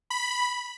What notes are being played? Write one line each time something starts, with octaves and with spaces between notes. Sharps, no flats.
B5